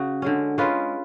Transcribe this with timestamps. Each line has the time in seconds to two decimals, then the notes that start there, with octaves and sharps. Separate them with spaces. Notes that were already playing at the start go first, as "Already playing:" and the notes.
Already playing: C#3 F#4
0.22 D3 G#3 C#4
0.58 G#3 C#4 F4 B4